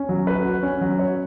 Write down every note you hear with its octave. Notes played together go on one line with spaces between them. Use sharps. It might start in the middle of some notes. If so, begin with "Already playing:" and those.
Already playing: C#4
F#3
B4
F#4
C#4
F#3
C#5